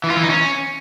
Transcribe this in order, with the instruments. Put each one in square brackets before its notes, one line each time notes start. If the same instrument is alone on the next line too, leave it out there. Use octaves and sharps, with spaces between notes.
[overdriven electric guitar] E3
F4
E3
D#4
C#4